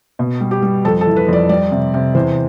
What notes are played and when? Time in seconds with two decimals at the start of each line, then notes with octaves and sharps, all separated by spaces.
0.19 B2
0.41 G3
0.51 G4
0.62 G3
0.85 F2 A4
1.01 A4
1.07 E3
1.16 B4
1.28 F2 D5
1.49 G3 D5
1.72 C3
1.94 C3
2.15 E2 C5